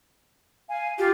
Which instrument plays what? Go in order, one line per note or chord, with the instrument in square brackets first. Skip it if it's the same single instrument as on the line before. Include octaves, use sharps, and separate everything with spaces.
[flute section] F5 G#5
[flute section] F4 [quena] G4